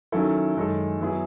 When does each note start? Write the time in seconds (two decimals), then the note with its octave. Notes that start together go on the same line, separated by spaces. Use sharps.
0.12 D#3 F#3 C#4 E4 A4
0.56 F#2 D#3 G#3 D#4 A4
0.99 F#3 B3 E4 G#4